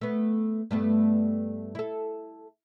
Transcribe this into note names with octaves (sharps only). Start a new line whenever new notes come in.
A3 B3
G2 A3 B3
E4 A4